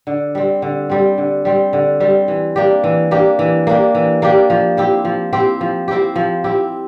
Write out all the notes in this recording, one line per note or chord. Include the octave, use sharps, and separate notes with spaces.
D3
G3 C4
D3
G3 C4
D3
G3 C4
D3
G3 C4
E3
A#3 D4 G4
E3
A#3 D4 G4
E3
A#3 D4 G4
E3
A#3 D4 G4
F3
C4 E4 G4
F3
C4 E4 G4
F3
C4 E4 G4
F3
C4 E4 G4